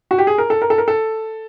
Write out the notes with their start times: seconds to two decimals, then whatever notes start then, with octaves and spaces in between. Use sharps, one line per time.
0.11 F#4
0.18 G4
0.27 G#4
0.38 A#4
0.50 A4
0.62 A#4
0.70 A4
0.78 A#4
0.88 A4